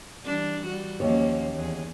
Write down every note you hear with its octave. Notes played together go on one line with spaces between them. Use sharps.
E3 G3 D4
G3 F#4
D#2 F3 A#3 C#4 C#5
E2 G#4